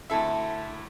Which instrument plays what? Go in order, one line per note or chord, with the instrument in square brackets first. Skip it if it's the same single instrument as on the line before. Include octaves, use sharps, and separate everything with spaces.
[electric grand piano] D2 E4 E5 [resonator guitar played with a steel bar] C4 A4